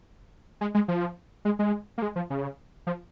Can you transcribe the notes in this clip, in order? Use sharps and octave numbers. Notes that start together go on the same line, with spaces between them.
G#3
G#3
F3
G#3
G#3
A#3
G#3
F3
C#3
F3